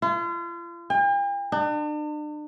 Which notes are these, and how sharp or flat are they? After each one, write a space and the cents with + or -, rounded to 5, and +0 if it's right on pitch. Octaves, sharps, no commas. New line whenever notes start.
F4 -40
G5 +45
D4 +40